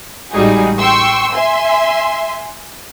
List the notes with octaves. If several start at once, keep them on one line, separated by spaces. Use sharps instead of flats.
A1 G3 G#3 D#4 F#4 G#4
G5 C6 C#6 E6
E5 G#5 C6